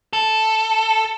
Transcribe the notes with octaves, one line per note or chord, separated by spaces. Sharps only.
A4